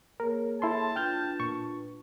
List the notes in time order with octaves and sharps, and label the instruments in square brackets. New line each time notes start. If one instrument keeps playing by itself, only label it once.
[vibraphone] A#3 G#4 C#5 [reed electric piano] A#4
[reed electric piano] E4 A4 C6 [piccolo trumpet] A5
[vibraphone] D4 F4 B4 [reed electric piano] G5 F6 G6
[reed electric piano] A#2 C#6